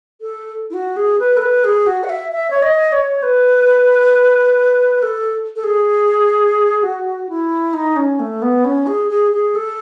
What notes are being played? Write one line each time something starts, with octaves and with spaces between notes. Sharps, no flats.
A4
E4
F#4
G#4
B4
A4
B4
G#4
F#4
F#5
E5
E5
C#5
D#5
C#5
B4
A4
A4
G#4
F#4
E4
D#4
C#4
A3
B3
C#4
G#4
G#4
G#4
A4